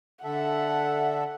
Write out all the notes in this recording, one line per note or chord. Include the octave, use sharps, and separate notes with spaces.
D3 A4 E5 F#5